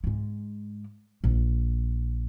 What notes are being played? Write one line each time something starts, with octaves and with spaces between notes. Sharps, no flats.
G#2 G#3
A#1